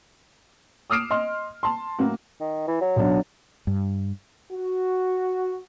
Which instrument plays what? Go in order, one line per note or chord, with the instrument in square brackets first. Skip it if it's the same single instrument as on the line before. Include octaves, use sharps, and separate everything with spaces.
[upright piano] D6 D#6 F6 C7 D7 E7
D#5 C6 F6
A5 C6
A2 F#3 A#3 C#4 F#4
[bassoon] D#3
E3
F#3
[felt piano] B1 D4
[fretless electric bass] G2
[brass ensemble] F#4